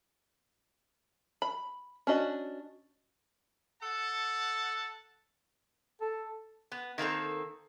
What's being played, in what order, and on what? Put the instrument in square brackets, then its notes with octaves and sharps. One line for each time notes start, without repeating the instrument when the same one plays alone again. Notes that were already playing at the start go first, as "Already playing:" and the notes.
[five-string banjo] B5
C#4 D4 F#4 D#5
[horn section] A4 F#5 A5
[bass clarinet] A4
[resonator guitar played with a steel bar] B3
D#3 A#3 C4 A4